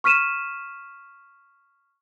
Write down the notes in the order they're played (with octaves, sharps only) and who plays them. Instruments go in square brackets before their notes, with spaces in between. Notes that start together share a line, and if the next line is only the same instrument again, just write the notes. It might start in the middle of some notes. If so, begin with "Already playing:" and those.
[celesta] C#6 F6 B6 D#7 E7